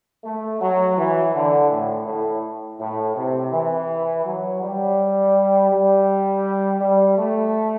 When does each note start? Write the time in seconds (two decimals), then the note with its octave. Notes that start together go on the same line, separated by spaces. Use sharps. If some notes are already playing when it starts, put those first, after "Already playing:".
0.25 A3
0.62 F#3
0.97 E3
1.34 D3
1.70 A2
2.06 A2
2.80 A2
3.15 C3
3.52 E3
4.25 F#3
4.62 G3
5.71 G3
6.80 G3
7.17 A3